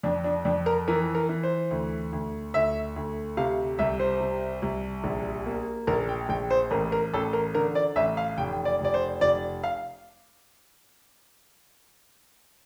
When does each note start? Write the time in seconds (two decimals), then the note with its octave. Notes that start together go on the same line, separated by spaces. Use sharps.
0.03 F2 D4
0.24 D4
0.45 F2 D4
0.66 A#4
0.88 E3 A#4
1.15 A#4
1.29 E3
1.43 C5
1.71 D2
2.13 D2
2.54 D2 E5
2.96 D2
3.37 C3 F5
3.79 C2 E5
3.99 C5
4.20 C3
4.62 C2
5.04 A#1
5.46 A#3
5.87 A#1 A#4
6.09 G5
6.29 A#1 G5
6.50 C5
6.71 A1 A#4
6.92 A#4
7.14 A1 A4
7.33 A#4
7.55 D3 A#4
7.75 D5
7.96 A1 E5
8.17 F5
8.38 F1 G5
8.65 D5
8.80 F1 D5
8.94 C5
9.21 F1 D5
9.64 F5